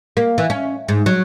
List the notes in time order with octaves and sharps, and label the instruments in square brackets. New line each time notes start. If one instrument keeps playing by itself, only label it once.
[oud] A#3
E3
C#4
G#2
F#3